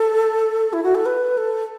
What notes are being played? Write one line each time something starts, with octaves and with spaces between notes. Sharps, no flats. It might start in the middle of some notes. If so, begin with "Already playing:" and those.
Already playing: A4
E4
F#4
A4
B4
A4